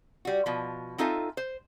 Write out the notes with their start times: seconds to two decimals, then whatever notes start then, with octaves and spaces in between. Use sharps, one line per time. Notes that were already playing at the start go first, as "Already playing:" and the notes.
0.25 G3 F#4
0.46 B2 F3
0.98 C4 D#4 F4 A4 E5 G#5
1.37 C5